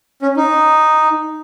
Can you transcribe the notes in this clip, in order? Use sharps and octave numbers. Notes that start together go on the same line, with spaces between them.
C#4
D#4